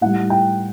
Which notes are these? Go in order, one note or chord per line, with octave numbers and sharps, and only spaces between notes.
A2 G3 F#5
G5